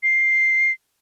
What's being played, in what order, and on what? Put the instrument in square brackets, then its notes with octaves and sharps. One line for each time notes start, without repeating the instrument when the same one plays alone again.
[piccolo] C7